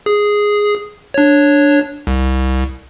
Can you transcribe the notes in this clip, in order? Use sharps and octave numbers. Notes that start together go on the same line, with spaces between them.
G#4
D4 C#5
C2